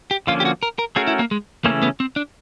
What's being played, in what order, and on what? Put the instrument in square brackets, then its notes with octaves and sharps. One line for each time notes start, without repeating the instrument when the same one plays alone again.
[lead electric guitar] G4
[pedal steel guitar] D3 F3 A#3 C#4 [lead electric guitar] F4
[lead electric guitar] G4
F#4
A#4
A#4
[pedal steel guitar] A3 C#4 F#4 A#4 [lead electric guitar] G#4
[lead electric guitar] E4
A#3
G#3
[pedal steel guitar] C#3 E3 A3 C#4 [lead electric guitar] A#3
[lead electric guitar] B3
C4
D4